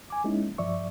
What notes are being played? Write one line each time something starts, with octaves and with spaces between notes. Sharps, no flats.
G#5 D6
G#3 A#3 C#4 D#4 E4
G2 F3 D5 E5 C#6